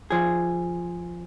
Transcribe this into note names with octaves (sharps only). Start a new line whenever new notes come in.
F3 G#4